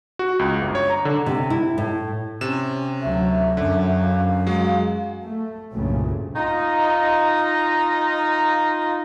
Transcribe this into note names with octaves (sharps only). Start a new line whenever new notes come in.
F#4
C#2
G1
C#5
A#5
D3
C3
E4
A2
C3 C#4 E7
D2 F#3 E5
F#2 D3
F5
F#3 G#3
A3
C2 G2 A#2 C#3 F#3 A3
D#4 F4